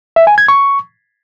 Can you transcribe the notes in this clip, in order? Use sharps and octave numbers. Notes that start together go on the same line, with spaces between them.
E5
G#5
G#6
C#6